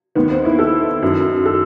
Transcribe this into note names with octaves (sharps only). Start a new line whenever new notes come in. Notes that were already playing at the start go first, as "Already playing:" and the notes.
D#2 D#3 B3
C4
E4
A4
F#2 D#3
A4